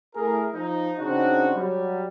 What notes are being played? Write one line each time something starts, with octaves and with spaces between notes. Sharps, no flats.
A3 E4 G#4 A#4
F3 D#4
C#3 C4 D4 D#4 F#4
F#3 G3